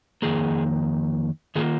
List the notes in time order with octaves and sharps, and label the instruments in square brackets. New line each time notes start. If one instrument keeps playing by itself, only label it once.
[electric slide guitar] F2 D#3 A#3 G#4
D#3 A#3 F4 G#4